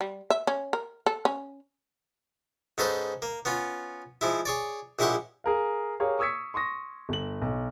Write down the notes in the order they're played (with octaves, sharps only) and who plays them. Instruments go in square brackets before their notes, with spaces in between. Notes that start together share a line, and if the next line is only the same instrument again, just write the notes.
[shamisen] G3
E5
C#4
A#4
A4
C#4
[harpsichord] G#2 C#4 A4 B4 C5 D#5
A#3
B3 C#4 F4
F3 G#3 E4
G#4 C#5 D5
A#1 G#3 E4 G4 F#5 C#6
[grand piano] G#4 A#4 F5
G4 G#4 A#4 C#5 F5
C#6 D#6 E6 G#6 B6 C#7
C6 C#6 D#6 A#6
G1 F#7
B1